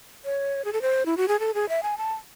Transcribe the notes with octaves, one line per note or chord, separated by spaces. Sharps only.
C#5
G#4
A4
C5
E4
F#4
G#4
A4
G#4
E5
G#5
A5